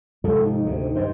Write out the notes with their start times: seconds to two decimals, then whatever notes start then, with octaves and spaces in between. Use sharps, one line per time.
0.24 G#2 C3 F3 A4
0.45 D#4
0.64 D2 C3
0.95 G2 D#3 C5